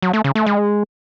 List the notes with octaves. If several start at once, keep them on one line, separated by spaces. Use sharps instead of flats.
F#3
A3
C#3
A3
G#3